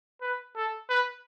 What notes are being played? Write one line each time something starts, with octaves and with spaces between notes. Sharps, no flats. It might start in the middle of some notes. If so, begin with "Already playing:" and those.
B4
A4
B4